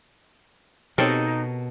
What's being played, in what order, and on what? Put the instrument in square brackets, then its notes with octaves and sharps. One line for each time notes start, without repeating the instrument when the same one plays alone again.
[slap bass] B2 [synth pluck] C4 G4 C#5 [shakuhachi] D#4 [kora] A4 A#4